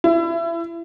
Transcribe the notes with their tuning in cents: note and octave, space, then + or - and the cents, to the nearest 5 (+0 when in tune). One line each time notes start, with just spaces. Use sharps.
E4 +25